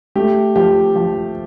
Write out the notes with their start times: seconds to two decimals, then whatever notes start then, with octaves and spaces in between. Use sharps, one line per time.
0.15 A3 G4
0.56 F3 G4
0.96 F3